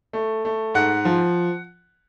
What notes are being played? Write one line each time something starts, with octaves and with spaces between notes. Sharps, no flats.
A3
A3
G#2 F#5
F3